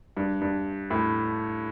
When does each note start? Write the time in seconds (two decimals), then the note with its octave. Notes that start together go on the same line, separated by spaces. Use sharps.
0.17 G2
0.41 G2
0.90 A2